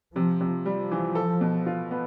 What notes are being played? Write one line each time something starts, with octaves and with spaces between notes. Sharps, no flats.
C3 F3
C3
F3 G3
E3
A4
B2
F4
B3